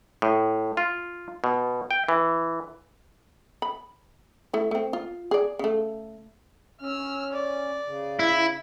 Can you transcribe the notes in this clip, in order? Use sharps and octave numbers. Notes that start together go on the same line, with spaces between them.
A2
F4
B2
G5
E3
B5
A3 E4
A3 C4
F4
G#4 D5
C#3 A3
C#4 E6 F6
D5
C#3
E4